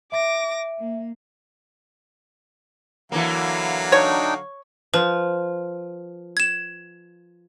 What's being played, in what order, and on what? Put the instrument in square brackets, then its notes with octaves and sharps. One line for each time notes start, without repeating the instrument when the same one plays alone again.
[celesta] E5 [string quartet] D6 A#6
[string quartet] A#3
[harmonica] D3 F#3 F5 [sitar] E3 A#3
[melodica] D4 D#4 G5 [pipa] C#5
[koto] F3 [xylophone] B4
[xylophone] G#6 E7